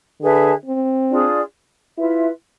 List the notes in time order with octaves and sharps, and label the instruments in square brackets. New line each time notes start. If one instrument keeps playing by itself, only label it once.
[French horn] D3 [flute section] G#4 B4 E5 A5
[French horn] C4
[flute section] D4 F4 G#4 D5
[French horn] E4 [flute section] F4 B4 E5